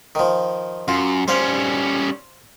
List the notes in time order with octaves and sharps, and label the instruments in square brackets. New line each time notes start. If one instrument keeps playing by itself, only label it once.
[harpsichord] D#3 F3
[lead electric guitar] F#2 [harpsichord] F4
[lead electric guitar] G3 C#4 [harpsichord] C5 F5